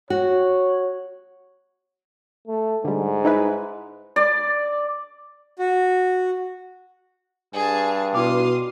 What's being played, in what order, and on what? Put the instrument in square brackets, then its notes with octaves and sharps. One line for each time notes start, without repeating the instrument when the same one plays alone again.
[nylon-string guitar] F#4 [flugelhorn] C#5
[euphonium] A3
[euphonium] G#2 [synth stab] D3 G3
[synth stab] D#4 E4 B4
[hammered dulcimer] D5
[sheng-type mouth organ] F#4
[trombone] G2 [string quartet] G#4 A5
[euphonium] B2 [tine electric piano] E4 D6 [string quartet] F5 C6 D#6